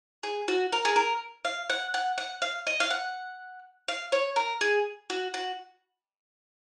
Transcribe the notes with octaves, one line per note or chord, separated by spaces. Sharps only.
G#4
F#4
A#4
G#4
A#4
F5
F#5
F#5
F#5
F5
D#5
F5
F#5
F5
C#5
A#4
G#4
F#4
F#4